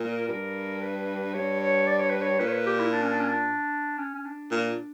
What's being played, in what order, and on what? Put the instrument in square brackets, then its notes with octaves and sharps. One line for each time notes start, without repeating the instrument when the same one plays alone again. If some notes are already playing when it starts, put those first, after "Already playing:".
Already playing: [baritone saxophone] A#2
[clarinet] A#4
[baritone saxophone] G2 [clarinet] A#4
[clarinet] B4
[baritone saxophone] G2 [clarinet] C#5
[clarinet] C#5
D5
C#5
B4
C#5
[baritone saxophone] A#2 [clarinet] B4
[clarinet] C#5
B4
G4
E4
D4
C#4
D4
C#4
D4
C#4
C#4
D4
[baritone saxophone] A#2